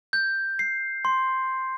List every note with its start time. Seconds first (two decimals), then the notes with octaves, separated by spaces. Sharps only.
0.13 G6
0.59 C7
1.05 C6